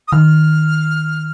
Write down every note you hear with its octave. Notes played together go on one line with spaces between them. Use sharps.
D#6
D#3 F6